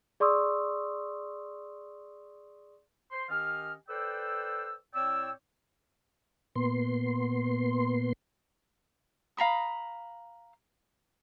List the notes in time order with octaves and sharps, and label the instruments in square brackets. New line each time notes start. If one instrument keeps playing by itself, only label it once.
[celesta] G#4 D5 C6 C#6 D#6 E6
[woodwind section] C5 C6
D#3 C#4 G4 D#5 F5 F6
A4 B4 C5 D5 G5 E6
A2 C4 C#5 D5 G5 E6
[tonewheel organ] A#2 B3 C6
[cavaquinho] F5 A#5 B5 D#6